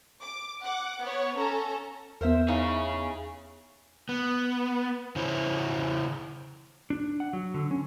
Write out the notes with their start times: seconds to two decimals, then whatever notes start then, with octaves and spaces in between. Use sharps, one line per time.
0.23 D6
0.63 F#5 D6
1.02 B3 C#5
1.38 C#4 A4 A#5
2.21 E2 B3 A#4 C5 E5
2.48 D#4 E4 G#4 C#5 F5
4.09 B3
5.16 C#3 E4 C5 C#5
6.90 D4
7.20 F#5
7.33 F#3
7.54 D3
7.71 C#4